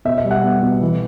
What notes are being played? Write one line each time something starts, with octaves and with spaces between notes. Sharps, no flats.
B2 E5
E5
G3
F#5
B3
B2
E3